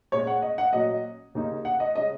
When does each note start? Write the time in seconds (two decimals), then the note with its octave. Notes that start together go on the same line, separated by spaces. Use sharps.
0.12 A#2 G#3 C#4 C#5
0.27 F#5
0.42 D#5
0.58 F#5
0.73 A#2 F#3 C#4 D#5
1.35 D#2 C#3 A#3 D#4
1.65 F#5
1.80 D#5
1.95 C#3 G#3 C#4 D#5